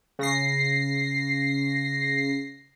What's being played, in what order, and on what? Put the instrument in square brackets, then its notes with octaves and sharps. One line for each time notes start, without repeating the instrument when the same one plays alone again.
[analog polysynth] C#3 A#6 C7